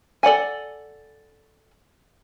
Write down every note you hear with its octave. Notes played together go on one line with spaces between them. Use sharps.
A4 D5 F#5 G#5